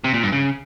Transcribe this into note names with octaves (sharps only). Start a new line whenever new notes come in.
C3
A#2
G2
C#3